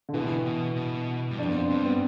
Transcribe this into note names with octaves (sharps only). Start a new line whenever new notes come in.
D3
B2 E3
B2
B2
G2
F2 D4
B3
C4
G2 C4
B3